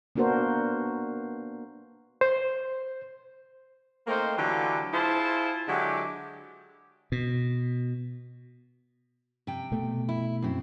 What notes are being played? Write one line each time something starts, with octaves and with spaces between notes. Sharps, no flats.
A#3 B3 D4 F#4 A#4 C5
C5
A3 A#3 C4 D#4 A#4 C5
D3 E3 F#3 F4 G4
E4 F4 G#4 C5 A5
D3 F#3 G#3 E4 G4
B2
C3 G5
B2 A3
E4
F#2 C4